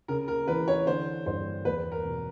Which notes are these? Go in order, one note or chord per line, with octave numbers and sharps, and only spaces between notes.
C#3 A#4
A#4
E3 B4
C#5
D3 C5
G2 C5
E2 B4
A#4
E1